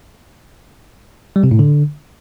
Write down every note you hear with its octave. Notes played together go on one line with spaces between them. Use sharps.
G3
C3
A2
D3